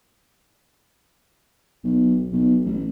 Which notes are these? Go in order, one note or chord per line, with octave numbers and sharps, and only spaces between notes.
B1
B1
A1